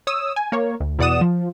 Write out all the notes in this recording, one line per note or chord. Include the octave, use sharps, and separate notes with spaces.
C#5 D#6 E6
G#5
A#3 C#5
D2
E2 B2 D5 F#5 D#6 E7
F3